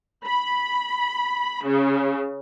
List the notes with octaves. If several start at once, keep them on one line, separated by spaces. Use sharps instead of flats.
B5
C#3